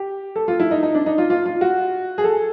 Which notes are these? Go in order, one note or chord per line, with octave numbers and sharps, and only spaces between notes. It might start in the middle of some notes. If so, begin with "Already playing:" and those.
Already playing: G4
A4
F4
E4
D#4
D#4
D4
D#4
F4
F4
F4
F#4
G#4
A4